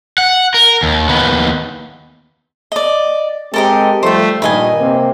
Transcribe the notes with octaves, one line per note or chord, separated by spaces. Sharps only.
F#5
A#4
D#2
D#2 B3
D5 D#5
G#3 C4 G4 A4 A#4 D#5
F3 G3 A3 C5 G5
G2 A#2 D#3 B4 D#5 G#5
C3 A#3 C4